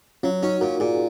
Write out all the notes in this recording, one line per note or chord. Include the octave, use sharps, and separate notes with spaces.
F#3 C#4 F4
C#4 D#4 F#4
A#2 F#4 A#4
A#2 F4 G#4